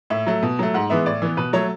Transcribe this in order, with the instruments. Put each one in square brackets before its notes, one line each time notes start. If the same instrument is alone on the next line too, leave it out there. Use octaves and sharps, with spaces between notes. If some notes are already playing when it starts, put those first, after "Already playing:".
[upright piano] A2 E5
F#3 A3
B2
F#3 A3
G#2 F#5
E3 G#3 B3 E5
A2 D5
E3 B3
B2 B4
F#3 A3 C#5